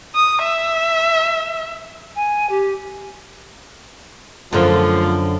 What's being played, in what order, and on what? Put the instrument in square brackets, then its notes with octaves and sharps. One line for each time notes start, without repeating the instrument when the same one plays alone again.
[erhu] D#6
E5
[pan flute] G#5
G4
[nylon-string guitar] F#2 D3 [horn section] F3 A3